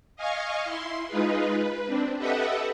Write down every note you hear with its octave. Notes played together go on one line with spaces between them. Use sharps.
D#5 F5 G#5 C#6
E4 C6
G#3 D#4 F4 G#4 B4
B4
C4 D4
G4 A4 B4 D#5 E5 F#5